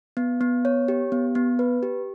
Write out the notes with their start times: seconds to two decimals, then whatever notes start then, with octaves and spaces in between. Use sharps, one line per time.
0.17 B3
0.41 B3
0.65 C#5
0.88 G4
1.12 B3
1.35 B3
1.59 B4
1.83 G4